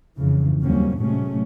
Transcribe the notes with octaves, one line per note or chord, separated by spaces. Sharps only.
F2 G#2 C#3 E3
D#2 F#3 G3 A#3 C4 C#4
A2 C3 F#3 G#3 A3 C#4